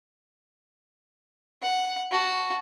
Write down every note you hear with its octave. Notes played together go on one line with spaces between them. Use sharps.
F#5
F#4 A5